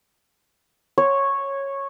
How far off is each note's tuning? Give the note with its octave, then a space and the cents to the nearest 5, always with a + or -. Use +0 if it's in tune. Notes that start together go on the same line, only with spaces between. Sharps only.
C#5 -10